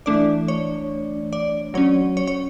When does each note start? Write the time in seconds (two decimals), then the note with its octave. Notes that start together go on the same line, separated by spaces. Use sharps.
0.06 E3 A3 D4 D5
0.48 C#5
1.33 D5
1.74 F#3 C#4 C#5
2.17 C#5
2.27 C#5